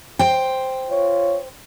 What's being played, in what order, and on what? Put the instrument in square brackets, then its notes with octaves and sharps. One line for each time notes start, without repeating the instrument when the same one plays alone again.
[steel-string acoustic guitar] C5 G5
[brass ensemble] F4 C#5